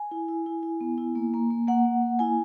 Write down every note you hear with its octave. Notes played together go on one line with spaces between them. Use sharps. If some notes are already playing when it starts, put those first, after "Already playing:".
Already playing: G#5
E4
E4
E4
E4
B3
E4
A#3
A#3
A#3
A#3 F#5
A#3
A#3
E4 G#5